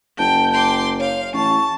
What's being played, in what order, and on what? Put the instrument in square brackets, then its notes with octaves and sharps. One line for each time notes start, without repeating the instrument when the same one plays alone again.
[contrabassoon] F#1 [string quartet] G5 [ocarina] A5
[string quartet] G5 C6 D6
[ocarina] C#5 [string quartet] F5
[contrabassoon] A1 [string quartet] A5 [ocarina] C#6